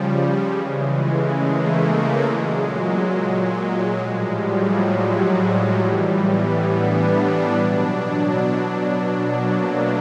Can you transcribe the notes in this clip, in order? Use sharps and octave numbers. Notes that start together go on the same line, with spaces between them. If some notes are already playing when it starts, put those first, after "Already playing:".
Already playing: C#3 F3 G3
C#3 E3 G#3
G#3
A3
A#3
A3
G#3
A#2 F#3
A2 F3 G3
F#3
A2 E3 G3
B3
D4
B2 F#3
B2 F#3 A#3
A3